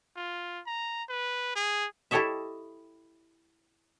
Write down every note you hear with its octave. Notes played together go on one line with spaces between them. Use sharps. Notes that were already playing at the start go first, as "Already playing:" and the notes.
F4
A#5
B4
G#4
E4 G4 A4 C#5 D#5 E5